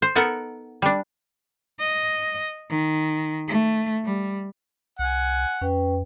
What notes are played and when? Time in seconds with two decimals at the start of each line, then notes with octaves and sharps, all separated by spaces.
0.02 C5
0.15 B3 D#4 A4 A#4 F#5
0.82 G3 D4
1.79 D#5
2.70 D#3
3.48 A3
4.05 G3
4.99 C2 F#5 G#5
5.61 F2 C#4 B4 G5